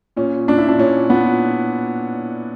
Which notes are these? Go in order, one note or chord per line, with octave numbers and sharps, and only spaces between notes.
A#2 C#4
A#2 D4
E4
D4
A#2 C#4
A#2 B3